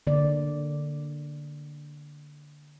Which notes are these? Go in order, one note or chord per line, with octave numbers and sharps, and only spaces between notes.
D3 A#3 D5